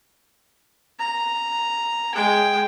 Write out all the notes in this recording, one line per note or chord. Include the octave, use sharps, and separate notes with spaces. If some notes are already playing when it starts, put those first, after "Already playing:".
A#5
G#3 G5